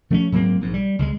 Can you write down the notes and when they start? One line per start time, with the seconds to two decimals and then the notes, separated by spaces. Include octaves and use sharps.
0.10 F3 A3 B3 C#4
0.32 G#2 F#3 A#3 C4
0.61 A#1 G#2
0.74 G3
0.99 C#2 G3 G#3